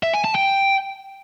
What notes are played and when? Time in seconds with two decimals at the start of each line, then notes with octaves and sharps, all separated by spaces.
0.03 E5
0.13 G#5
0.24 A5
0.35 G5